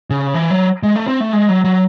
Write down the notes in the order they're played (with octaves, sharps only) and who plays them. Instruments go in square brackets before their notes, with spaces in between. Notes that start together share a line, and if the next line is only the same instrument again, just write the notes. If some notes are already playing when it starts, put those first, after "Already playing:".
[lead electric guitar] C#3
E3
F#3
G#3
A3
C4
A3
G#3
F#3
F#3